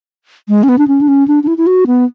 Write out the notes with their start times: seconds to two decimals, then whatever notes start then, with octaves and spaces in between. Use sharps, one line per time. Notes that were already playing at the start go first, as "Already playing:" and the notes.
0.49 G#3
0.63 C#4
0.69 B3
0.78 D4
0.88 C#4
1.01 D4
1.08 C#4
1.28 D4
1.43 D4
1.47 E4
1.58 E4
1.67 F#4
1.87 B3